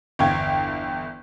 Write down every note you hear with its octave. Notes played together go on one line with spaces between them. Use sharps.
G1 E2 F5 G5 G#6